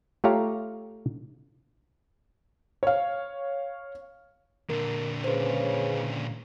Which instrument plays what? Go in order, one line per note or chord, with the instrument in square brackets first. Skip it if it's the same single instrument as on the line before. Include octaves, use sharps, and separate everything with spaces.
[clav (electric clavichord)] A3 F4 G4 C#5 F5 A#5
[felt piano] C#5 F5
[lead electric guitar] A#2 D3 [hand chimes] A#4
[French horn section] C#3 [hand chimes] B4 C5